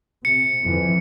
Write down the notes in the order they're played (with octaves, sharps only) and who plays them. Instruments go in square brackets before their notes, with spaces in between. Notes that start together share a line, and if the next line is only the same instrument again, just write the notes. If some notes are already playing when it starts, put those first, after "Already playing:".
[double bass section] C3 [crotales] C#7
[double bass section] F2 E3 F3